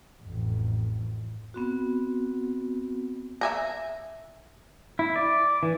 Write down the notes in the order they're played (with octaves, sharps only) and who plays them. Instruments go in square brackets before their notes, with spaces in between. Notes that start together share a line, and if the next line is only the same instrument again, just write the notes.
[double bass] A1 F2
[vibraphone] B3 C4 F#4
[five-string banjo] E5 G#5 A#5
[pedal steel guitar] E4
D5
E3